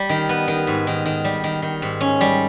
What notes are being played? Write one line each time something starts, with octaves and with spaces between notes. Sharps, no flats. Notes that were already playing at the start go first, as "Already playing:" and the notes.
Already playing: G3
D#3
B3
D#3
G#2
D#3
D#3
G3
D#3
D#3
G#2
C#4
G3